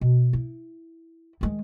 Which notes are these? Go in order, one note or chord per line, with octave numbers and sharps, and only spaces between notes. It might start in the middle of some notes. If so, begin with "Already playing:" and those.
B2
E4
D#3 G#3